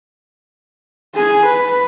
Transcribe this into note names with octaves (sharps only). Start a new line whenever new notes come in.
G#4 G#5
B4